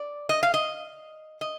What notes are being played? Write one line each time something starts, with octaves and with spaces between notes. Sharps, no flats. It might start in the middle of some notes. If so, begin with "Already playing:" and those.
Already playing: D5
D#5
F5
D#5
D#5